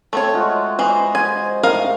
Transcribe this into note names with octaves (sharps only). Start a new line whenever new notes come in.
A3 C4 C#5
G#3 F4 F#4
E3 C5 D#5 F#5
C5 G#5
A2 D#4 A#4 F5